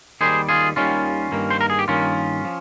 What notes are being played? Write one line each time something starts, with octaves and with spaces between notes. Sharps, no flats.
D#2 D#3 G3 G#4 C5
F4 G#4
D#2 D#3 G3 C#4 F4
G2 D#3 A#3
C5
A#4
G#4
G4
G2 D#3 A#3 C#4 F4
F3